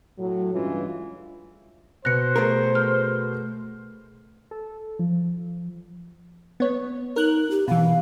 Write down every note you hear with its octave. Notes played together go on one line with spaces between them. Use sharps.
A2 F#3
G2 C#3 E3 G#3 C#4 F4
B2 C5 F#6 A#6 C#7
A3 G#4 A#4
F6
A4
F3
B3 C#5
D#4 A#4 F#6
G4
B2 E3 F5